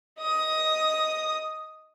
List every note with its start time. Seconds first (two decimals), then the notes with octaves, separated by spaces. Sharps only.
0.20 D#5 D#6